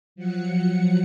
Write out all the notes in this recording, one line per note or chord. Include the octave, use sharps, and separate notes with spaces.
F3 F#3 F#5 C#7